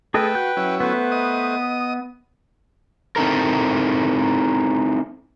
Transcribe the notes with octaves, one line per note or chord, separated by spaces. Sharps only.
A3 G#4 A4 B4 D#5 G5
F#4 G6
F#3 C#4 E4
A3 B3 B4 C5
D#5 D#6
C4 D#4 E4 A4 A#4